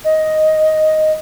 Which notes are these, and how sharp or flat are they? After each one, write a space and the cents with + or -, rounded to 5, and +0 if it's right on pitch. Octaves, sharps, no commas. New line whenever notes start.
D#5 +5